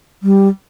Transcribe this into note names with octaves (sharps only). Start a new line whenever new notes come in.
G3